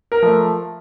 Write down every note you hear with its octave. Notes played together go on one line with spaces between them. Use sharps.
A#4
F3 A3